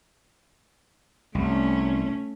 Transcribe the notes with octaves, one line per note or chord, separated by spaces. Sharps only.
C2 A3 C#4